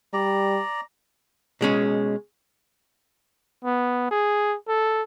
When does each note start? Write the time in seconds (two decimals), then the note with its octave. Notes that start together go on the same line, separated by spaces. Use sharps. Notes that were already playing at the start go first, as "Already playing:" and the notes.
0.13 G3 D5 A#5
1.61 B2 G#3 C#4
3.65 B3
4.11 G#4
4.68 A4